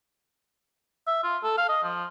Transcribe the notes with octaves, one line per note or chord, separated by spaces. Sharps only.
E5
F4
A4
F5
D#5
F3